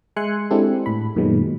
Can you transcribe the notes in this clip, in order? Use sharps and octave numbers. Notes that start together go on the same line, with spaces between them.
G#3 E5 G#5 C6 F#6 C#7
G#3 C4 D4 E4 G4 A4
A2 B5
F#2 A#2 D#3 F#3 G#3 B3